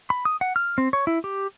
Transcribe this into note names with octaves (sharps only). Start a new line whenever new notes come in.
B5
D#6
F#5
F6
C4
C#5
E4
G4